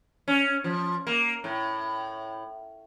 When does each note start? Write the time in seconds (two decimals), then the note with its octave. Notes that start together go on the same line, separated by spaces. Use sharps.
0.28 C#4
0.64 F3
1.07 A#3
1.44 A2